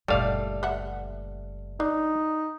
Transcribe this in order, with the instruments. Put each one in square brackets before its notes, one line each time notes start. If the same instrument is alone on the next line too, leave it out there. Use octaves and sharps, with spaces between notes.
[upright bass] F#1 A#2 [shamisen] D#3 D5 [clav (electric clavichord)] G3 A3 F5
[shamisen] B4 E5 F#5
[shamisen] D4 [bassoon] D#4